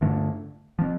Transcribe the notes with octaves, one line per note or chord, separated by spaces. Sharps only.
G2 D3 A3 D4
F3 C4